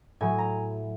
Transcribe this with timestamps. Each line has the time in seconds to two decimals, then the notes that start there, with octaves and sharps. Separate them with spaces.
0.21 A2 F#3 G#5
0.38 A#5